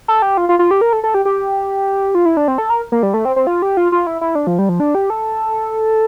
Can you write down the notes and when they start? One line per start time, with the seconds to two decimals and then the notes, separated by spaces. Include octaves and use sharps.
0.08 A4
0.22 G4
0.37 F4
0.49 F4
0.59 F4
0.71 G4
0.81 A#4
0.93 A4
1.04 A4
1.14 G4
1.25 G4
2.15 F4
2.25 E4
2.37 D4
2.48 C4
2.58 A4
2.70 A#4
2.92 A#3
3.03 G3
3.14 A3
3.25 C4
3.36 C4
3.47 F4
3.62 G4
3.77 F4
3.92 F4
4.07 E4
4.21 E4
4.35 D4
4.47 F3
4.59 G3
4.69 F3
4.80 D4
4.95 G4
5.10 A4